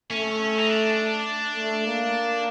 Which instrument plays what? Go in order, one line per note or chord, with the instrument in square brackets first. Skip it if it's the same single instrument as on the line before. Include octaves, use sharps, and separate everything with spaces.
[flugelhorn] A3 [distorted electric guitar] C#4
[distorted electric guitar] D#4
D4
[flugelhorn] A3
A#3